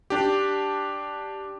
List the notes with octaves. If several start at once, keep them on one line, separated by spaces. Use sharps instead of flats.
D4 G4